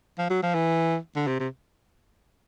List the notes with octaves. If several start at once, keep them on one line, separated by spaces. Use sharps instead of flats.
F3
F#3
F3
E3
D3
C3
C3